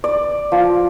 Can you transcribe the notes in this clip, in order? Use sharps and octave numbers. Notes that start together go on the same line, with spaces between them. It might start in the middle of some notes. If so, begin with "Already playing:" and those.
D5
F3